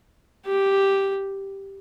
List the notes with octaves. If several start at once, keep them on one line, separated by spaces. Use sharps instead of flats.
G4